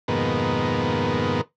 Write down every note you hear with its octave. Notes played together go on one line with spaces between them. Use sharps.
F2 G#2 B2 D#3 A#3 B3